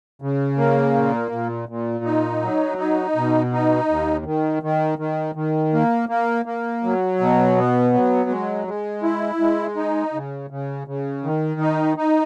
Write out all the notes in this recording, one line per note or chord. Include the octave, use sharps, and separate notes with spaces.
C#3
A#3
A#2
A#2
A#2
D#4
F#3
D#4
B2
D#4
D#2
D#3
D#3
D#3
D#3
A#3
A#3
A#3
F#3
B2
B3
F#3
G#3
G#3
E4
G#3
D#4
C#3
C#3
C#3
D#3
D#4
D#4